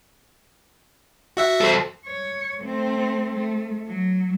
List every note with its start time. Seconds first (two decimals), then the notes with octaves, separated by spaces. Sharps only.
1.37 F#4 E5 F#5
1.61 A4 C5
2.07 C#5
2.61 A3 C4
3.34 A3
3.87 F#3